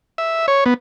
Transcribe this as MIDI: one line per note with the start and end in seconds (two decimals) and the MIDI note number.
0.18 0.46 76
0.48 0.64 73
0.66 0.74 59